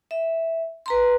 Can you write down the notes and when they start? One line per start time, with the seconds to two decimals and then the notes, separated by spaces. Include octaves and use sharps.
0.11 E5
0.86 B4 A#5 C6